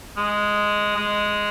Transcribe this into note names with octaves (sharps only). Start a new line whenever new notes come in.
G#3
G#3